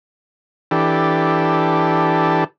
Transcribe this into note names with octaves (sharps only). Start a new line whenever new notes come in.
E3 D4 G4 A4